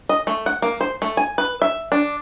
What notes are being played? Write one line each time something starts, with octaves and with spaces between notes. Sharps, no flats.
D#5
A3
F#5
A#3
C5
A3
G#5
B4
E5
D4